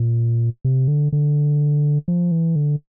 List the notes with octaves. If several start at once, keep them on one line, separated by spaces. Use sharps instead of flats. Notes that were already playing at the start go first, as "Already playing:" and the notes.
Already playing: A#2
C3
D3
D3
F3
E3
D3